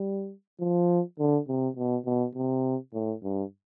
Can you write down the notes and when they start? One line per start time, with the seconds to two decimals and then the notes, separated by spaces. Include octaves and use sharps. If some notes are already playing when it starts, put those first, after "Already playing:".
Already playing: G3
0.60 F3
1.19 D3
1.48 C3
1.77 B2
2.06 B2
2.35 C3
2.94 A2
3.23 G2